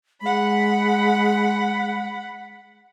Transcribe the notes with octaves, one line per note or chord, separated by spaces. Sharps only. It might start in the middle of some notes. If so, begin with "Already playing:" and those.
G#3 F#5 B5